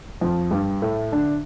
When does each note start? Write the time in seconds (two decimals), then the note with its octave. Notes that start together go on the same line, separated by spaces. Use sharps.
0.21 F2 F3
0.51 G2 G3
0.82 A2 A3
1.12 D3 D4